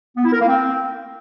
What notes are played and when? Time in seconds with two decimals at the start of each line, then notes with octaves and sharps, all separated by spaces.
0.17 B3
0.25 E4
0.32 A#4
0.40 A#3
0.48 C4